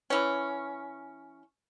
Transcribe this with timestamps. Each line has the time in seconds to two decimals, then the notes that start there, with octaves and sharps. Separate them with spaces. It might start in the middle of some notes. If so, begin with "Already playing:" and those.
0.10 E3 C#4